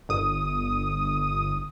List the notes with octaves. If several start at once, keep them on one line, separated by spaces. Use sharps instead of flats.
G1 D#6